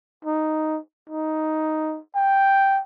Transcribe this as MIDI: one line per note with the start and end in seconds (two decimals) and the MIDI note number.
0.25 0.79 63
1.10 1.99 63
2.16 2.81 79